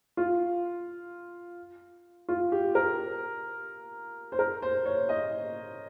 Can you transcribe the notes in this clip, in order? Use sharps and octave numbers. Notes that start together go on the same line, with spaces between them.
F4
F4
G4
A#4
C5
A#4
C5
C#5
D#5